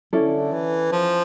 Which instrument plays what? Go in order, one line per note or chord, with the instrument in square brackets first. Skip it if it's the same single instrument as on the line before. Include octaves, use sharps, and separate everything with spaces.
[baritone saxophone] D3 [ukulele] C#4 E4 A4 D5
[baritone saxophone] E3
F3